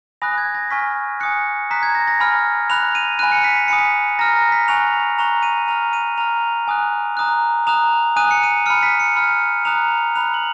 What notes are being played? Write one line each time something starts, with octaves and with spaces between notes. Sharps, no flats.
G#5 B5 D#6 F#6 A#6
G#6
A#6
G#5 C#6 F6 B6
G#5 D#6 F#6 C#7
A#5 D#6 F#6 B6
G#6
A#6
A#6
G#5 B5 F6
B5 F#6 F7
D#7
G#5 B5 F#6 D#7
C#7
B6
B6
G#5 B5 D#6 C#7
B6
A#5 F6 A#6
A#6
B6
G#5 C#6 F#6 F7
A#5 C#6 F#6 F7
D#7
A#5 F6 F7
D#7
A#5 F6 F7
G#5 D#6 F#6
A#5 D#6 F#6
A#5 D#6 F#6 F7
G#5 D#6 F#6 D#7
C#7
D#7
B5 F6 C#7
B6
C#7
B5 F6
A#5 D#6 F#6 F7
B5 F#6 F7
F#7